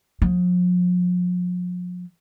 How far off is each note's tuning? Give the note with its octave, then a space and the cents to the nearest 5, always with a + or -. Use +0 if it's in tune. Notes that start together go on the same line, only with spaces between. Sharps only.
F3 +45